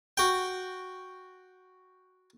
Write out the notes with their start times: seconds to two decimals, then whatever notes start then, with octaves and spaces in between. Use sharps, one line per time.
0.17 F#4 G5